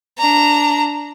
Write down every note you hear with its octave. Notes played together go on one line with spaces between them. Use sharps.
D4 A#5